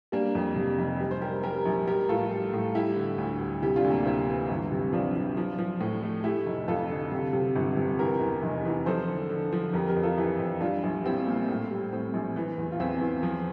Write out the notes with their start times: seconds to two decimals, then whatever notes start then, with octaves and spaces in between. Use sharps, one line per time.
0.12 G3 A#3 D4
0.35 F2
0.56 C3
0.78 F1
1.00 G3
1.11 C5
1.21 G3 G4 A#4
1.43 G3 G4 A#4
1.65 A#1
1.87 G3 G4 A#4
2.09 A2 F4 A4
2.31 G3
2.53 A2
2.74 G3 E4 G4
2.96 D3
3.18 D2
3.40 G3
3.62 C3 E4 G4
3.76 D4 F4
3.84 D2
3.91 A#3 D4
4.06 C3 C4 E4
4.27 E3
4.49 G1
4.72 C3
4.93 F3 D4 F4
5.16 F3
5.37 F3
5.59 F3
5.81 A2
6.02 A3
6.24 A3 E4 G4
6.46 F1
6.68 F2 F4 A4
6.90 D3
7.12 C3
7.33 C3
7.55 G1
7.77 C3
7.99 E3 G4 A#4
8.20 E2
8.43 F1
8.65 E3
8.86 F3 A4 C5
9.08 D3
9.30 D3
9.53 F3
9.73 F2 G4 A#4
9.88 G4 A#4
9.96 F2
10.03 F4 A4
10.17 E3 E4 G4
10.40 F2
10.61 G3 D4 F4
10.83 A#1
11.04 G3 C4 E4
11.27 A#2
11.48 A2
11.71 G3
11.93 A2 C4
12.14 A#1
12.36 E3
12.58 E2
12.72 F4
12.80 E2 C4 E4
13.01 E2
13.23 F3